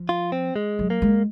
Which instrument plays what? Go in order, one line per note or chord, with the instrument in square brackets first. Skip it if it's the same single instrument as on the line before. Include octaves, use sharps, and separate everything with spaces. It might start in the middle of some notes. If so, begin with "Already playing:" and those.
Already playing: [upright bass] F3
[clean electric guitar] F4
C4
G#3
[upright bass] F#3
[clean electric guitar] A#3
[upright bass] G#3